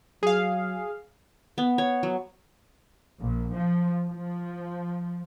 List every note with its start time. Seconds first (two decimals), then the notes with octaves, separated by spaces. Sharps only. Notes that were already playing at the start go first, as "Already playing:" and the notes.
0.23 F#3 G#4 F5
1.58 B3
1.78 C#5
2.03 F#3
3.20 A#1
3.54 F3
4.09 F3